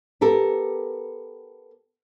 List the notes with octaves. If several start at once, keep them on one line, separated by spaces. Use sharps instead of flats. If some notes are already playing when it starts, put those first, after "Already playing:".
B3 G4 A4 A#4